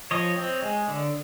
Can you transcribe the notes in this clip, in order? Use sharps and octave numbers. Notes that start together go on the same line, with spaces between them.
F3 C#5 D#5
C4
G#3
D3